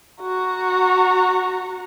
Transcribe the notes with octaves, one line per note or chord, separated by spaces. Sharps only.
F#4 A#5